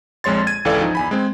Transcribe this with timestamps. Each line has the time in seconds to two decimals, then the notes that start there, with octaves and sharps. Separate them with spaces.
0.24 A#1 F2 G#3 C#5 C6 A6
0.47 G#6 D#7
0.65 G#1 C#2 E3 A4 D5 F5
0.81 F3 D#4
0.95 E2 G#5 B5
1.11 G#3 C4